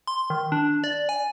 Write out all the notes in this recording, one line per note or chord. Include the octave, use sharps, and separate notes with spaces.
C6
D#3
D4
D5
G#5